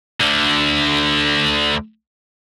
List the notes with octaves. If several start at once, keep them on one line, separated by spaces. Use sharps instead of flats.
D2 D3